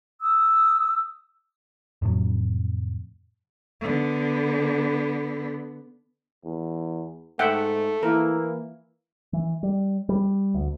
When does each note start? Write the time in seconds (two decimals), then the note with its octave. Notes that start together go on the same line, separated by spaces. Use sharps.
0.21 D#6 E6
2.02 F2 A2 C3 F#3
3.81 D3 B3
6.45 E2
7.39 G#2 A3 E5 F#5 G5
8.03 E3 A#3 E4 A#4
9.33 E3
9.63 G3
10.09 G3
10.54 D2